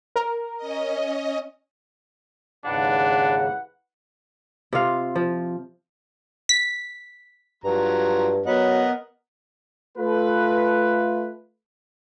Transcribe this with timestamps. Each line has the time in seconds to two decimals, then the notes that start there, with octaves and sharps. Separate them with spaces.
0.16 A#4
0.57 C#4 D#5
2.65 D#2 G#2 C#3 E3 D4 B4 F#5
4.73 C3 F4 F5
5.16 F3
6.49 B6
7.64 G2 F3 F#3 A#5
8.46 F#3 B3 A#4 B4 D#5 F#5
9.98 A3 F4 A4 B4